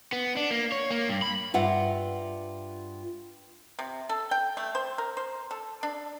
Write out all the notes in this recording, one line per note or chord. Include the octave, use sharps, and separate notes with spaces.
B3
D4
A#3
C#5
A#3
G2
B5
G2 F4 E5 F#5
C3
A4
G5
A3
C5
A#4
C5
A4
D4